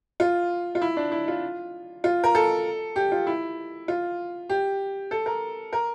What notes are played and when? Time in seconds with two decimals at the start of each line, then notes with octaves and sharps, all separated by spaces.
0.20 F4
0.75 F4
0.81 E4
0.97 D4
1.12 E4
1.28 F4
2.04 F4
2.24 A#4
2.35 A4
2.96 G4
3.12 F4
3.27 E4
3.88 F4
4.49 G4
5.11 A4
5.26 A#4
5.73 A#4